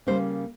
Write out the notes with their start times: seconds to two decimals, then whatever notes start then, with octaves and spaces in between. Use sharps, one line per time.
0.07 C#3 G3 A#3 C#4 C5